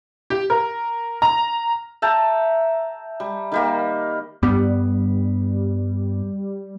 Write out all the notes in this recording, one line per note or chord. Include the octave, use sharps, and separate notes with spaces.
G4
A#4
A#5
E5 G5 A5 A#5
G3
D#3 G3 A#3
G2 G3 B3